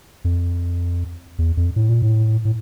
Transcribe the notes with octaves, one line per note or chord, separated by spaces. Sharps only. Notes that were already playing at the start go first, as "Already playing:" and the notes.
F2
E2
F2
A2
A#2
A2
A2